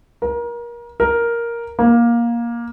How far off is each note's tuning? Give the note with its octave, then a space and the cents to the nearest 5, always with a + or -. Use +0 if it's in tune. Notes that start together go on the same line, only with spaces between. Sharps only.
A#4 +30
A#4 +5
A#3 +15